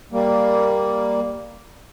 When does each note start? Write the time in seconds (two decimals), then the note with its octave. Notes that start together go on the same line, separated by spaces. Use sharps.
0.12 G3 A#3